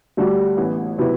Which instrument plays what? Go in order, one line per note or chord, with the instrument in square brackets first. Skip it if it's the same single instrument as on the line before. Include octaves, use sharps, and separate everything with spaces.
[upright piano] D2 D3 G3 D4 F#4
A1 A2 E3 B3
C3 F#3 B3 E4